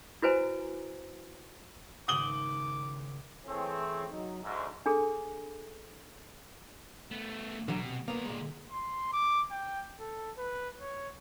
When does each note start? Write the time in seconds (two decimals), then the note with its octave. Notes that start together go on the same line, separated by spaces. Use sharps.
0.22 E4 F#4 B4 C5 G#5 A#5
2.08 G#1 C#3 G#4 D6 D#6 F#7 G7
3.46 E3 A3 C4 G#4 C#5
4.10 F#3 D#4
4.43 D2 G#2 D5 E5
4.86 D4 G#4 A4
7.11 A3 B3
7.68 B2 D3 E3 F#3
7.83 C3
8.08 D3 A#3 B3 A#5
8.26 A#2 G#3
8.71 C6
9.13 D6
9.51 G5
10.00 A4
10.37 B4
10.80 C#5